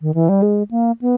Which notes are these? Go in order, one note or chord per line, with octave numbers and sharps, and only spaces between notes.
D#3
E3
G3
G#3
A#3
B3